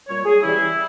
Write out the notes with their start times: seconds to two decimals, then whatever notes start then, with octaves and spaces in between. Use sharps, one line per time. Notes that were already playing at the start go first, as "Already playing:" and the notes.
0.08 A#2 G3 C#5
0.25 G#4
0.42 C#3 E3 G3 E4